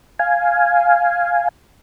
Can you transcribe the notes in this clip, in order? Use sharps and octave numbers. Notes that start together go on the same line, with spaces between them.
F5 G#5